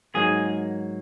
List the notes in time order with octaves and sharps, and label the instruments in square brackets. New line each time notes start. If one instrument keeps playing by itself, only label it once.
[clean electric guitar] G#2 F#3 A#3 G#4